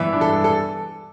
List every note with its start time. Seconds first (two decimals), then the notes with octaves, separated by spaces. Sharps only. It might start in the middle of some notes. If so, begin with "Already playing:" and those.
Already playing: G2 E3 B3 D4 E5
0.13 D4
0.21 A4
0.30 G2
0.44 A4